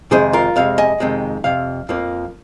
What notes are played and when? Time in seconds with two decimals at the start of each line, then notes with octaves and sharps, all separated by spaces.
0.11 F2 C3 D#3 G#3 G#4 C5
0.33 F4 A#4
0.56 F2 C3 G#3 F5
0.78 D#5 G#5
1.00 F2 C3 D#3 G#3
1.44 F2 C3 F5
1.89 F2 F3 A#3